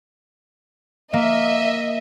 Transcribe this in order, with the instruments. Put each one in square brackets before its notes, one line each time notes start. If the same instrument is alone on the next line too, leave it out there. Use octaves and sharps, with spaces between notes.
[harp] A#3 [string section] D#5 E5